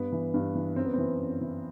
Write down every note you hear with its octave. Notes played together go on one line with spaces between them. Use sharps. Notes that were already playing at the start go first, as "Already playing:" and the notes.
Already playing: G2 B3
E3
G2
E3
F#2 C4
B3
E3 C4
F#2
E3